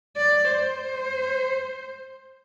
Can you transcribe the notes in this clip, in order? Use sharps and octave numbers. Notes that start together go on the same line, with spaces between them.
D5
C5